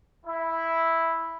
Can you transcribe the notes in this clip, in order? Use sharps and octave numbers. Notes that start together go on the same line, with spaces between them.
E4